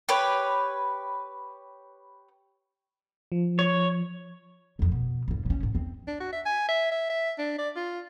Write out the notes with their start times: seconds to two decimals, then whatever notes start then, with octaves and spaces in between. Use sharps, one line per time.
0.09 G4 B4 C#5
3.32 F3
3.59 C#5
4.79 E1 F2
4.92 B2
5.28 E2 G2
5.46 C3 C#4
5.63 G#2
5.75 E2 C4
6.07 D4
6.20 F#4
6.32 E5
6.45 G#5
6.68 E5
6.92 E5
7.10 E5
7.38 D4
7.59 D5
7.76 F4